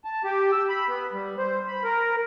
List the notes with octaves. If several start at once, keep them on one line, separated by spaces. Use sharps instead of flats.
A5
G4
E6
B5
B3
G3
C5
B5
A#4